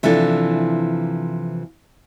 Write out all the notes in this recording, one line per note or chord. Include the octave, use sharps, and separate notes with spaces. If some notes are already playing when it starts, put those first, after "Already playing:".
C3 E3 F3 D4 E4 A4